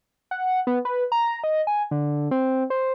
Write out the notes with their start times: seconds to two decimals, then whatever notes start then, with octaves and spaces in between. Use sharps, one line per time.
0.31 F#5
0.67 B3
0.85 B4
1.12 A#5
1.44 D#5
1.67 G#5
1.91 D3
2.31 C4
2.70 C5